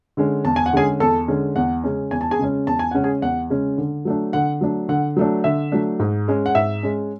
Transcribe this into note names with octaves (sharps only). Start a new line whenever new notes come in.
D3 G#3 C#4
E2 A5
G#5
F#5
D3 G#3 C#4 G#4 G#5
E2 A4 A5
D3 G#3 C#4
E2 F#5
C#3 G#3 C#4
E2 G#5
A5
G#4 G#5
C#3 G#3 C#4
E2 A5
G#5
C#3 G#3 C#4 F#5
G#4 G#5
E2 F#5
C#3 G#3 C#4
D3
F#3 A3 D4
D3 F#5
F#3 A3 D4
D3 F#5
F#3 A3 D4
D3 E5
F#3 A3 D4
G#2
G#3 C#4
F#5
G#2 E5
G#3 C#4